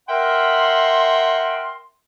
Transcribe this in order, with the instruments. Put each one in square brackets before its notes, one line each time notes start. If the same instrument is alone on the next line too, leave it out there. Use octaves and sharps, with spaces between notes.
[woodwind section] A#4 E5 F#5 G5 C6